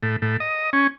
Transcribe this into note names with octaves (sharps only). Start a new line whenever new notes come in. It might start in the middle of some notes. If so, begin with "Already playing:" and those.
A2
A2
D#5
C#4